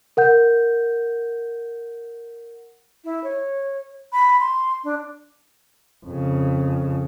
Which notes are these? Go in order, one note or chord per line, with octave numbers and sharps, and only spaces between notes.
A#4 F#5 G6
E4
C#5
B5
C6
D4
F2 C#3